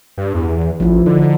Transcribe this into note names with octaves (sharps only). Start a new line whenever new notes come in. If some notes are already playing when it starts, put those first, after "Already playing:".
G2
E2
E2
A1 F3 E4
D3 D#4